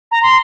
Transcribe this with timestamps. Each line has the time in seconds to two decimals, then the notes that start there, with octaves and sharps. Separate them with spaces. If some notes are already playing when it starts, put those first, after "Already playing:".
0.11 A#5
0.23 C6